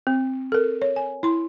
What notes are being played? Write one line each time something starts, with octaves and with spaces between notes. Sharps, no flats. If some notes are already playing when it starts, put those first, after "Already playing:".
C4
A4 A#4
C#5
G#5
E4 C6